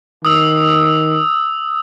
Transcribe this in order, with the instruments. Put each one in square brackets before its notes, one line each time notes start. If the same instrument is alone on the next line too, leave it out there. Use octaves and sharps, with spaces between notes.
[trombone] D#3 [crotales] D#6 E6